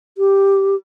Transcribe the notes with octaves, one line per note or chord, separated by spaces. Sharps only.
G4